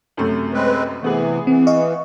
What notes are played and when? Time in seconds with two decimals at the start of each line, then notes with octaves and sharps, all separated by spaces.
0.17 F#2 C3 A3
0.53 G#3 C4 B4
1.02 C3 E3 A3 B3 G#4
1.47 E3 C4
1.67 D#5 F5 C#6